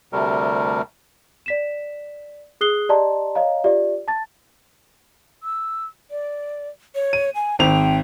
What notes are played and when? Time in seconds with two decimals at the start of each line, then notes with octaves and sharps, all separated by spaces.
0.13 D2 C3 G3 A3 A#4
1.46 D5 B6 E7
2.61 G#4 D#6 F#6 C7 G7
2.89 G4 D5 D#5 A5 A#5 C6
3.35 C#5 D#5 F5 A#5
3.64 F4 G4 D5 E5
4.08 A5 A6
5.43 E6
6.11 D5
6.95 C#5
7.13 D#7
7.35 G#5
7.59 G#1 C4 G5 F7